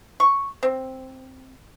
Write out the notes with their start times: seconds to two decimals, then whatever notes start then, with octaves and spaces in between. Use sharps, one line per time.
0.20 C#6
0.63 C4